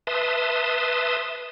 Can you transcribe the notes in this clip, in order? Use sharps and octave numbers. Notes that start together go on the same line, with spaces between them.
B4 E5 A5 C6 D#6